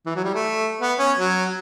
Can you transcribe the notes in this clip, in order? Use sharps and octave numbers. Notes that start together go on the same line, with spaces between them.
E3
F#3
G3
A3
B3
C#4
F#3